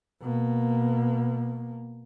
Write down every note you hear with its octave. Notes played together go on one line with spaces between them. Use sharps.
B2 A#3